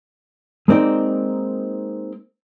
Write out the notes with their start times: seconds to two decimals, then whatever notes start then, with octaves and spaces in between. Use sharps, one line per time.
0.68 G#3 A#3 C4 D#4 D5